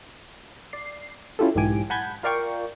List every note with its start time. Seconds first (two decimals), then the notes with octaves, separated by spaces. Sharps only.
0.73 D5 C7
1.39 C#4 E4 F4 G4 A4
1.55 B1 G#2 E3 G4 G#5 D7
1.90 F#5 G#5 A5 B5 G6 G#6
2.23 F4 A#4 D5 F5 G5 C#6